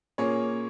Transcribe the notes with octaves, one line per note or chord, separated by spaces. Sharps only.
A#2 A#3 C#4 G#4 C#5